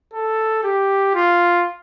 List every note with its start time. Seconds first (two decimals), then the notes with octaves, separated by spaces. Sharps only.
0.13 A4
0.63 G4
1.14 F4